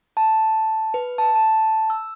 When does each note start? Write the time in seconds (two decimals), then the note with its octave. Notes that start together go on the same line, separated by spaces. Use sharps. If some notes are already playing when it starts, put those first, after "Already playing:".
0.17 A5
0.94 B4
1.18 A5
1.35 A5
1.90 E6